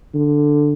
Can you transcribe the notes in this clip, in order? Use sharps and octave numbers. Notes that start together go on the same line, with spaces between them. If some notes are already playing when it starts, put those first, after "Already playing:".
D3